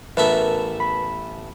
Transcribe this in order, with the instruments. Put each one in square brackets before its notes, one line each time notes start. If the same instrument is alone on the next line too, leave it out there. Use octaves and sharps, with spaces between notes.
[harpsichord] A1 A3 E5 [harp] B3 A#4 [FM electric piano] B4
[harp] B5